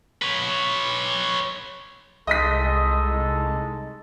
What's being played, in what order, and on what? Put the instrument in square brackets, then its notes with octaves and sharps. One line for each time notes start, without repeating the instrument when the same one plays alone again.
[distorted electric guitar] B4 C#5
[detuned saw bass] C2 [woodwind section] G#3 D#4 A4 [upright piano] D#5 D#6 B6